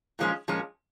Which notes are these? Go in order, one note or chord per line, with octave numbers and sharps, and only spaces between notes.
A#2 F3 G#3 C#4
A#2 F3 G#3 C#4